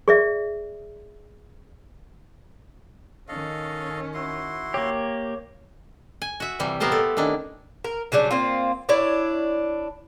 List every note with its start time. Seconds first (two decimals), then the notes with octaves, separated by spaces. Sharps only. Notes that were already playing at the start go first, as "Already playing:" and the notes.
0.08 G#4 D5 E5
3.28 D#3 C#4 A4 D#5 F5
4.14 E4 F#4 C6
4.74 A#3 G4 C#5
6.22 G#5
6.40 F#4 E5
6.59 C3 E3 G3
6.80 A#2 B3 G4 A#4 C5 A5
6.92 A3 A4
7.17 D#3 C#4 D4 E4
7.84 A#4
8.12 C#3 F#3 G3 D4
8.31 A#3 C4 F4
8.89 D4 E4 C#5 D5